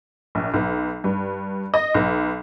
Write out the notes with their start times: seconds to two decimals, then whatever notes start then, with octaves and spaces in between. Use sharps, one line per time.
0.35 A#1
0.54 B1
1.04 G2
1.74 D#5
1.94 B1